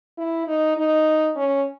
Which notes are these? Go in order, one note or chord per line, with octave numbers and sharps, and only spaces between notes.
E4
D#4
D#4
C#4